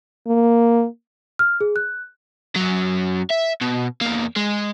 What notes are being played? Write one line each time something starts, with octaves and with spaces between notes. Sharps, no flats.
A#3
F6
G#4
F#6
F#2 F#3
E5
B2
E2 A#3
G#3